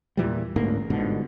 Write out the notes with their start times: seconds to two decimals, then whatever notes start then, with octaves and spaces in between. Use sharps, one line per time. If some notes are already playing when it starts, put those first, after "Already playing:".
0.17 E2 A#2 E3 G3
0.56 A1 D2 G#2 A#3
0.90 G1 G#2 B2 D3